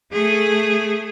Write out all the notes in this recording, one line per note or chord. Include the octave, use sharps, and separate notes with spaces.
A3 G#4